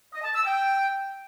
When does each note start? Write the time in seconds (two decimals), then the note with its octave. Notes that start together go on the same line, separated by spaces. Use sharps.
0.13 D#5
0.24 A5
0.34 E6
0.45 G5